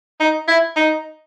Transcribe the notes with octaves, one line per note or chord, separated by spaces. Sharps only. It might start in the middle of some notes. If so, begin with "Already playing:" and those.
D#4
E4
D#4